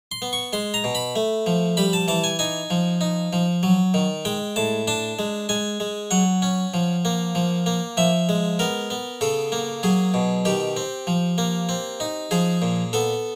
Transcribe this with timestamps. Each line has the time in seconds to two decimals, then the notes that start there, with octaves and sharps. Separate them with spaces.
0.12 C6
0.22 B3
0.33 C#6
0.53 G#3 C6
0.74 A#5
0.84 B2
0.95 B5
1.16 A3
1.46 F3
1.77 G3 B5
1.93 A5
2.08 E3 A5
2.24 G#5
2.39 D#4 G#5
2.70 F3
3.01 D#4
3.33 F3
3.63 F#3
3.94 D#3
4.25 G#3 G5
4.56 A2 A5
4.87 D4 A5
5.19 G#3
5.49 G#3 G#5
5.80 G#3
6.11 F#3 F#5
6.42 C#4
6.74 F3
7.05 A#3
7.35 F3
7.66 A#3
7.97 F3 E5
8.29 G#3
8.59 B3 A#4
8.90 B3
9.21 C#3 A4
9.52 A#3
9.83 F#3 G#4
10.14 B2
10.45 D#3 G4
10.77 C4
11.07 F3
11.38 A#3
11.69 C4
12.00 D#4
12.31 F3 G#4
12.62 A#2
12.93 B3 A4